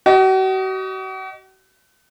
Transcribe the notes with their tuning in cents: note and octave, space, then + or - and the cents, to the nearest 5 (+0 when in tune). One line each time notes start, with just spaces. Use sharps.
F#4 +40 D#5 +5